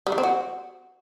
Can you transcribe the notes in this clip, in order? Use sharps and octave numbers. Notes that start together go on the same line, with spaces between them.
G3
E3
C4
F#4